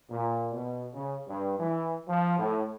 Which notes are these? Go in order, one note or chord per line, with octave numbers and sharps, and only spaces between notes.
A#2
B2
C#3
G2
E3
F3
A2